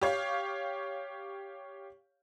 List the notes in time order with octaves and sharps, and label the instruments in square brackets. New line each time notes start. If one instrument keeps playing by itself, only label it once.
[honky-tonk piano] G4 C#5 F5